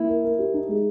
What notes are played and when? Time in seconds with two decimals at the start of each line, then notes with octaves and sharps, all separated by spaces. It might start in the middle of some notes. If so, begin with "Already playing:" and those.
Already playing: A#3 E4
0.09 A#4
0.24 A#4
0.39 G4
0.54 D#4
0.68 G#3